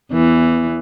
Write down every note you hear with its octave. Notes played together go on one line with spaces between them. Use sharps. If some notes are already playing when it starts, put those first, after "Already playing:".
E2 E3